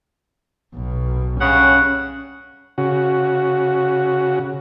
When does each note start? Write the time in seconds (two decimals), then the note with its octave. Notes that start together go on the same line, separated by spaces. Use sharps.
0.74 B1 B2
1.40 G2 C#3 C#4 F#5
2.78 C#3 F#4